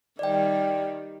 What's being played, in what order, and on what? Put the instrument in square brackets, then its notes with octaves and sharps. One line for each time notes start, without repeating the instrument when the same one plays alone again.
[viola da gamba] D#3 G3 [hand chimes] D5 G5